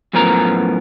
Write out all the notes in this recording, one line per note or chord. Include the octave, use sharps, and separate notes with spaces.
F#2 A2 F3 B3 A#4 A#5